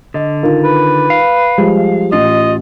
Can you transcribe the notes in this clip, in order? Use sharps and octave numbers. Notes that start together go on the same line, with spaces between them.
D3 D#5
D#3 F4 A#4
B4
F5
F3 G3 G#3
A1 F4 D#5